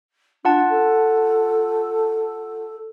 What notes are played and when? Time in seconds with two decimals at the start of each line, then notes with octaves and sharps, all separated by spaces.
0.45 D4 F4 F#5 A5
0.69 A4